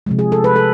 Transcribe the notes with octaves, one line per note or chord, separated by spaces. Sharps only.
C3 F3 G#3
G#4
A4
B4
A4